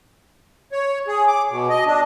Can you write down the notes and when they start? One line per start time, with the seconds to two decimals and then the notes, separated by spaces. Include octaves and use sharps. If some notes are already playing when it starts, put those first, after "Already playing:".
0.72 C#5
1.07 G#4
1.28 D6
1.51 B2
1.69 D#5
1.87 D4